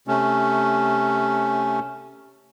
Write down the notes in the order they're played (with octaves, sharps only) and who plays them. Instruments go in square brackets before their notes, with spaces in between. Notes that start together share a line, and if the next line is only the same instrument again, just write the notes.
[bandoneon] C3 A3 C#4